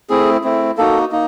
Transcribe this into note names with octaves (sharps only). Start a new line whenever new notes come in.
A3 C4 E4 G#4
A3 C4 E4
A#3 D#4 F#4 A4
A#3 D#4